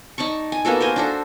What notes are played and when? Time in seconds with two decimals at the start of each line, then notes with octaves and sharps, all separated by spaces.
0.18 D#4 D5 A5 C#6
0.52 G#5
0.65 A#3 B3 F#4 A4
0.80 A#4 C5 G#5
0.96 D4 F#4 A4